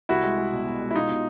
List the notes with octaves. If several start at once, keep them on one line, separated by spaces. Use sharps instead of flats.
C2 E4 F#4
G#3
G#3
B2
B2
G#3
E4
B2 D#4 F4
B2